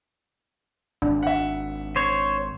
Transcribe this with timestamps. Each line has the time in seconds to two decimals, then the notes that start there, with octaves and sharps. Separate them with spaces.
1.02 G#1 D4
1.23 E5 F#5
1.96 C5 C#5